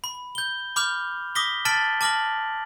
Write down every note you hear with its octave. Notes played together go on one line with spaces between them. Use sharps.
B5
G6 G7
B5 D6 F6 G6 F7
D6 D#6 A#6 B6 G7
A5 F6 A6 B6 D7 F#7
A5 D6 F6 A#6 F#7